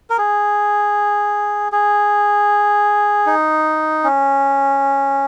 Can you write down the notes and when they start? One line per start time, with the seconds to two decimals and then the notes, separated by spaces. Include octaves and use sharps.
0.10 A#4
0.18 G#4
1.72 G#4
3.27 D#4
4.04 C#4